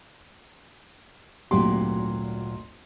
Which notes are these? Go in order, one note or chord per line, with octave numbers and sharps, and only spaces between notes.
G#1 D2 A#2 F#3 G4 C6